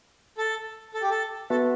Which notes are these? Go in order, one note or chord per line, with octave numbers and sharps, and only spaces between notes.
A4
A4
G4
A4
B3 F#4 A4 B4 E5 A5